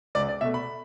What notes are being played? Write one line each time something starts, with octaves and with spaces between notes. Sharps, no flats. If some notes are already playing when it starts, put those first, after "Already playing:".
C#2 D5
D5
B2 A3 E5
B5